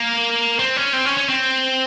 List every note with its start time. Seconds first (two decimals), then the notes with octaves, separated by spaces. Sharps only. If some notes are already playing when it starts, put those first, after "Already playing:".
Already playing: A#3
0.59 C4
0.77 C#4
0.94 C4
1.06 C#4
1.17 C#4
1.29 C4